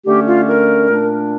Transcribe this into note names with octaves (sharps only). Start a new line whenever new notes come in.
D3 A3 C#4 G4
F4
A#4
A#2 A3 D4